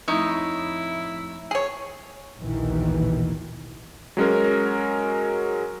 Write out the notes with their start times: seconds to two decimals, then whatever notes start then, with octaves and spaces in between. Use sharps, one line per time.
0.08 F2 A2 D#4 E4 C#5
1.51 G#4 C#5
2.40 A#1 D#2 B2 D#3 E3
4.17 F#3 G#3 C#4 A#4